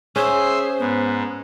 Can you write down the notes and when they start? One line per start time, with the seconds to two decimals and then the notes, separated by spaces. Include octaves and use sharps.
0.16 C#4 G#4 C5 E5 C6
0.79 G#2 B3